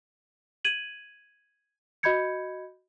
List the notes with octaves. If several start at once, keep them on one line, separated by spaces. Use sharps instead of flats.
G#6 D#7 F#7
F#4 D#5 B5 G6 G#6 C#7